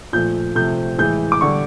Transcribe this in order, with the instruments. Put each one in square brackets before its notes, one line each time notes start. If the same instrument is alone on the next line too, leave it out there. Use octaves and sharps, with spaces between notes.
[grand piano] A#2 F3 A3 G6
C3 F3 A3 G6
A2 E3 G#3 G6
D6
D3 G3 C#6